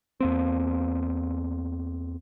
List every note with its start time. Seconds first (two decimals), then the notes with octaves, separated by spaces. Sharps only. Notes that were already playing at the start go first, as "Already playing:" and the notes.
0.20 E2 A#3 C4